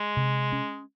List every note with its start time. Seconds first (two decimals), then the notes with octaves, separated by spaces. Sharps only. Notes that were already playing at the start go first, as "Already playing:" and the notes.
Already playing: G#3
0.17 C3
0.52 C#4